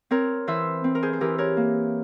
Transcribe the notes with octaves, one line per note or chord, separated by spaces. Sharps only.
C4 A#4 C#5
E3 C5 E5
C4
A#4
G#4 C5
C5
E3 G4 A#4
A#4 C#5
A#3